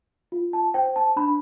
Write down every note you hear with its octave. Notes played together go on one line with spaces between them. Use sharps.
F4
A5
C5 G5
A5
D4 B5